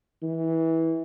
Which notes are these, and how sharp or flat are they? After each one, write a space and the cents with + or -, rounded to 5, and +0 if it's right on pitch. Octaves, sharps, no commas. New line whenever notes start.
E3 -20